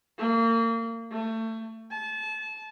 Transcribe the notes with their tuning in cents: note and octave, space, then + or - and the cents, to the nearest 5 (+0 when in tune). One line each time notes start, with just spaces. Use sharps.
A#3 -30
A3 +25
A5 -30